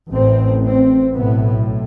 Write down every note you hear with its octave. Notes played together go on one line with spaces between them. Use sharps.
A1 A2 C4
C4
B1 A2 B3